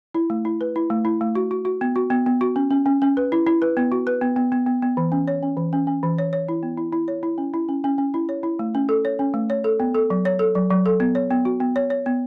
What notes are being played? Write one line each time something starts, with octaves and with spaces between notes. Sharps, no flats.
E4
A3
E4
B4
E4
A3
E4
A3
F#4
F#4
F#4
B3
F#4
B3
B3
F#4
C#4
C#4
C#4
C#4
B4
E4
E4
B4
B3
F#4
B4
B3
B3
B3
B3
B3
E3
C#4
C#5
C#4
E3
C#4
C#4
E3
C#5
C#5
E4
B3
E4
E4
C#5
E4
C#4
E4
C#4
C#4
C#4
E4
C#5
E4
A3
C#4
A4
C#5
C#4
A3
C#5
A4
B3
A4
F#3
C#5
A4
F#3
F#3
A4
B3
C#5
B3
F#4
B3
C#5
C#5
B3